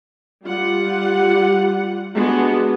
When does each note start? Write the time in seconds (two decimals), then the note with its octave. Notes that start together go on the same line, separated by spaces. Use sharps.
0.45 G3 F4 F#5
2.15 G#3 B3 D4 F#4 G4